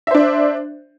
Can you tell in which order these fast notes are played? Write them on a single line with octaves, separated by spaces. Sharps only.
E5 C5 D4